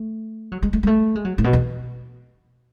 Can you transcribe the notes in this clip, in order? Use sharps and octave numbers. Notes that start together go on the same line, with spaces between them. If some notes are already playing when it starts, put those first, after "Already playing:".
Already playing: A3
F#3
G#3
A3
G#3
A3
G#3
F#3
A2
B2
E2